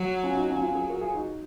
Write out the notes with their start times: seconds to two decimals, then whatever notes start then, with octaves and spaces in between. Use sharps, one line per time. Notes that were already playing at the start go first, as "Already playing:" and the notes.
Already playing: F#3
0.24 C#4 F4
0.36 D#4 F#4
0.49 C#4 F4
0.62 C#4 F4
0.75 F4 G#4
0.89 F#4 A#4
1.01 F4 G#4
1.14 D#4 F#4